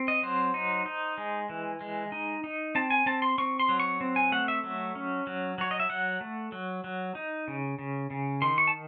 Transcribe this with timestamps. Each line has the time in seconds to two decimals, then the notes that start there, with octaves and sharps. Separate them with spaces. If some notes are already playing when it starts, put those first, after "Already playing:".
Already playing: C4
0.08 D#5
0.23 F#3 C5
0.54 D#4
0.86 D#4
1.18 G#3
1.49 E3
1.81 G#3
2.12 D#4
2.44 D#4
2.75 C4 A5
2.90 G#5
3.06 C4 A5
3.22 C6
3.38 C4 C#6
3.60 C6
3.69 F#3
3.80 C#6
4.01 C4
4.16 G#5
4.32 A3 F#5
4.48 E5
4.64 F#3
4.95 C#4
5.27 F#3
5.58 F#3 C#5
5.71 D#5
5.80 E5
5.90 F#3 F#5
6.21 A3
6.52 F#3
6.84 F#3
7.15 D#4
7.48 C#3
7.79 C#3
8.10 C#3
8.42 D#3 C6
8.58 C#6
8.67 A5